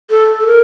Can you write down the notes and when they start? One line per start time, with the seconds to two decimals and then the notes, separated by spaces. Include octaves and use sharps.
0.10 A4
0.40 A4
0.47 A#4